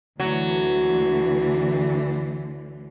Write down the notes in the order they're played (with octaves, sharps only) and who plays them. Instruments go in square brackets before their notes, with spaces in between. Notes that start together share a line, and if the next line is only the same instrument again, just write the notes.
[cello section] D2 D3 E3 [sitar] F#3